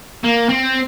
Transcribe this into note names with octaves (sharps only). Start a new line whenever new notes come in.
A#3
C4